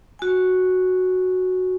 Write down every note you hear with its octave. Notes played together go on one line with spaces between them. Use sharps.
F#4 G#5